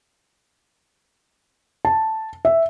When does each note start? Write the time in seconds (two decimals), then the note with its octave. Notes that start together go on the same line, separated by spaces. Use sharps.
1.85 A5
2.45 E5